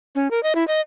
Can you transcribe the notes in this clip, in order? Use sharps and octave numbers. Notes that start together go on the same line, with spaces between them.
C#4
A#4
D#5
E4
D#5